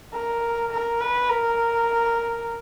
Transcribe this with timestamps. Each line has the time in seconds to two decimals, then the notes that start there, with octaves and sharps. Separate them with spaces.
0.12 A#4
0.71 A#4
1.00 B4
1.29 A#4